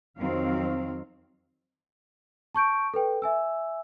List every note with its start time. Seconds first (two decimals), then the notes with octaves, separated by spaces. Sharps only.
0.18 F2 D#3 F#3 C4 F5
2.55 A5 C#6 G6 D7
2.94 A4 B4 G5
3.22 E5 G#5 E6